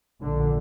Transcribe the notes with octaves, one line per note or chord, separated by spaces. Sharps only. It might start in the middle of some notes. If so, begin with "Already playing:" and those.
A#1 A#2 D3